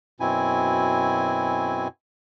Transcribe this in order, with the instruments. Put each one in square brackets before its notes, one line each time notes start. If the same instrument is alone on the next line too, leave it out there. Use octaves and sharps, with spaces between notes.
[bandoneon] F#2 B2 C4 E4 G#5